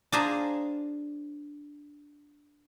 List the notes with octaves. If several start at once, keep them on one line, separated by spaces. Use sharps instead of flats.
D4 F4 G#4 C5 G#5 A#5